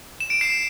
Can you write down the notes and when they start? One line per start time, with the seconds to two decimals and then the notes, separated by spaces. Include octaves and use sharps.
0.20 E7
0.30 D7
0.41 C7 E7